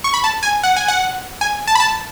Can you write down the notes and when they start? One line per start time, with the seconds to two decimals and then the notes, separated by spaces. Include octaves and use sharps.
0.04 C#6
0.14 B5
0.24 A5
0.43 G#5
0.63 F#5
0.76 G#5
0.88 F#5
1.41 G#5
1.67 A5
1.75 B5
1.80 A5